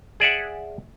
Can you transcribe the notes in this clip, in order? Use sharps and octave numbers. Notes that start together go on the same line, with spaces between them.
G#4 D5 E5 F#5